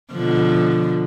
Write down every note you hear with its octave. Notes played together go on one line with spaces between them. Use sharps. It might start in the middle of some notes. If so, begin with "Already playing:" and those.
B2 D3 F3